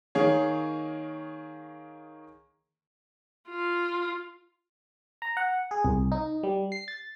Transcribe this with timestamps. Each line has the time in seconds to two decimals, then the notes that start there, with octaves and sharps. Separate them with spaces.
0.15 D#3 A#3 G#4 C#5
3.49 F4
5.22 A#5
5.37 F#5
5.71 G#4
5.85 C2
6.12 D#4
6.43 G3
6.72 C7
6.88 A6